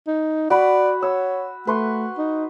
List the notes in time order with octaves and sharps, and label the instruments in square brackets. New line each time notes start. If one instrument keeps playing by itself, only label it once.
[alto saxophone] D#4
[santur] F#4 B5 [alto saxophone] D5
[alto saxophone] C#5 [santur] E6
[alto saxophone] A3 [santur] B4 C6 C#6
[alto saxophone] D#4